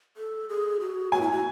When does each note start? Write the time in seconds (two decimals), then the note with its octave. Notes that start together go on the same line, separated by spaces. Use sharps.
0.17 A4
0.49 G#4
0.80 F#4
1.12 F#4 G#5
1.21 E4
1.32 F#4